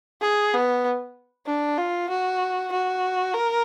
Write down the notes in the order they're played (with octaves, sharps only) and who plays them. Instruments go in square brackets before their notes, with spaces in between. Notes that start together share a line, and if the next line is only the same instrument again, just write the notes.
[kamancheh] G#4
B3
D4
F4
F#4
F#4
A#4